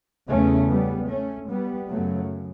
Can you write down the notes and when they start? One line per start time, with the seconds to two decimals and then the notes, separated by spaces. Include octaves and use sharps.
0.29 E2 C#3 A3 C#4
0.70 G3 B3
1.09 A3 C#4
1.49 G3 B3
1.89 F#2 C#3 F#3 A3